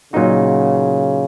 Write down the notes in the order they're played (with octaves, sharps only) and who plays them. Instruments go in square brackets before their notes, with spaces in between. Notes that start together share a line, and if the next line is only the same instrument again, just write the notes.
[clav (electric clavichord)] A#2 F#3 A#3 D#4 F#4 [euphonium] C#3